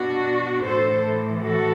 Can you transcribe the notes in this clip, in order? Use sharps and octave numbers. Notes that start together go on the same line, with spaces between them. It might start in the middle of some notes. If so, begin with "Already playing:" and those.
Already playing: B2 D4 F#4
A2 E3 A4 C5
F#4 A4